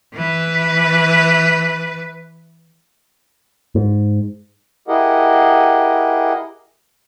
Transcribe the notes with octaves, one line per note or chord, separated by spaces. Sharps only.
E3 B4
G#2
E4 G4 G#4 A#4 D#5 F#5